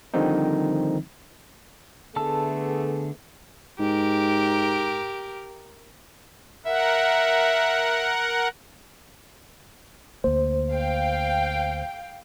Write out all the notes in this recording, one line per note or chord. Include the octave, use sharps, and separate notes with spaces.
D3 D#3 F3 G3 C4 D#4
D3 A3 B3 G#4 A5 E6
G#2 G4 A#4
A#4 E5 F#5
D2 A#3 C5
F5 G5